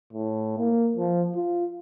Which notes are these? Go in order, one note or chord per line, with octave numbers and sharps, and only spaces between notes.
A2
A#3
F3
F4